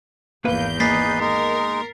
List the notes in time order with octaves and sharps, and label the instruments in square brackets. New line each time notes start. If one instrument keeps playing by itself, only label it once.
[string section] G#1 E2 G6 [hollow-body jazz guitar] A#3 B4 F5
[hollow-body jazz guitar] A#3 [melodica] D#4 G#4 B4 [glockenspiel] A6 B6 C7
[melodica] G#3 D#4 [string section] A#4